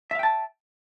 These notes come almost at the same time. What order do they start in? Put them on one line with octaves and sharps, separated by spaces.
E5 F5 G5 A5